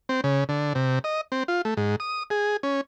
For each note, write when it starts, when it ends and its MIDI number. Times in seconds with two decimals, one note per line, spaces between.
0.09 0.21 60
0.24 0.44 49
0.49 0.73 50
0.75 0.99 48
1.04 1.21 75
1.32 1.43 60
1.48 1.62 65
1.65 1.74 57
1.77 1.96 44
2.00 2.23 87
2.30 2.57 68
2.63 2.81 61